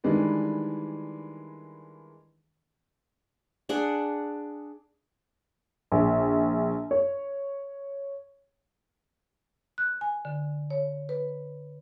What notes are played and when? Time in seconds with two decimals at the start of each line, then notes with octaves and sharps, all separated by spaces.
0.04 D#3 E3 G3 G#3 D4 B4
3.69 D4 G#4 F#5
5.92 A#1
6.91 C#5
9.78 F#6
10.01 G#5
10.25 D3
10.71 C#5
11.09 B4